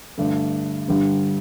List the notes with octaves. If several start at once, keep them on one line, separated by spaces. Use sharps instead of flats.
G2 D3 A3 D4
G2 D3 G3